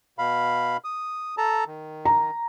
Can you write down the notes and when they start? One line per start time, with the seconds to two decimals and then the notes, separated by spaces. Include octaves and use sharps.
0.19 B2 F5 B5
0.84 D#6
1.38 A4 A5 A#5
1.67 D#3
2.05 A#5